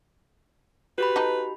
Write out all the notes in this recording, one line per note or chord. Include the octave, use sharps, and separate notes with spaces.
F#4 G4 B4 B5
D#4 A4